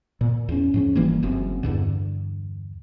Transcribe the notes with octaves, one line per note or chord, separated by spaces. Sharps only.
A#2
E2 C#4
G#2 F3 C#4
F#1 E3 G3 A#3
F#1 F#2 C4
E2 G2 D3